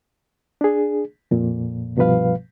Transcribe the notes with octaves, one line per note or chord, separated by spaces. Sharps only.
D4 G#4
F2 A#2
C2 G2 B2 F3 B4 F5